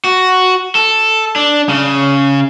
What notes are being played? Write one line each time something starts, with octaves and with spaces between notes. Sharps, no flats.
F#4
A4
D4
C#3